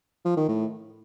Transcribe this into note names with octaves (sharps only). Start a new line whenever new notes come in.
F3
D#3
A2